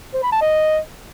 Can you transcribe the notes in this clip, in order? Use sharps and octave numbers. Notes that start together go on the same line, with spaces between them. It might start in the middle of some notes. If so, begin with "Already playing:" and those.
C5
B5
A5
D#5